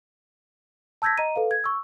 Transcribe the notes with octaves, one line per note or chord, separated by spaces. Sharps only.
A5 E6 G6 G#6 A#6 B6
D#5 A#5 D#7
A4 B4 F5
G#6
C#6 E6